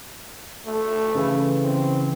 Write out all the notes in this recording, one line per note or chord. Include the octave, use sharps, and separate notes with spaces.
A3
C#3 E3 E4
C4